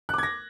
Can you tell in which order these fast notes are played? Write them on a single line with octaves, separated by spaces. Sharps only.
F#6 D6 G#6 A#6